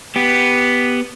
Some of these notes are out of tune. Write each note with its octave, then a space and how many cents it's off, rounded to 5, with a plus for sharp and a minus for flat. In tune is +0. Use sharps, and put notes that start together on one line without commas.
B3 +0 G4 +0